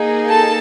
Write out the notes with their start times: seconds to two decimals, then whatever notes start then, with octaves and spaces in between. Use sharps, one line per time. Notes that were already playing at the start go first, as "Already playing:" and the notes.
Already playing: A#3 D#4 G#4
0.28 A4 A5